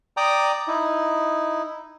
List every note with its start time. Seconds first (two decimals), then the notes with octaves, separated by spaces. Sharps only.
0.17 D5 G5 A#5 D6 D#6
0.68 D#4 E4